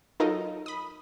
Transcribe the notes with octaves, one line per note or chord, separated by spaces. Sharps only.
F#3 D#4 F4 A4 A#4 D#5
B5 D#6